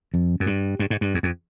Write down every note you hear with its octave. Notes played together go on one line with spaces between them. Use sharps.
F2
F#2
G2
G2
G#2
G2
E2
F2